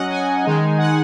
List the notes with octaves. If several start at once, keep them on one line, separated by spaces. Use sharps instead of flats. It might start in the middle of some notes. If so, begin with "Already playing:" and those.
Already playing: F#3 C#4 D#5 F#5
G#5
D#3 G#3 D#4
F#5